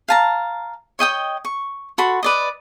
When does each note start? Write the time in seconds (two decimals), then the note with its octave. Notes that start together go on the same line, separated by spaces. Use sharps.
0.08 F5 A5 A#5
0.99 C#5 D#5 G5 D#6
1.45 C#6
1.98 F#4 A4 B5 C6
2.23 B4 D5 D#5